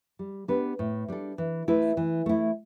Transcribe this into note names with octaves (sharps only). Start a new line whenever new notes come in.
G3
B3 D4 G4 B4
A2
G3 D4 A4
E3
A3 E4 B4
E3
A3 E4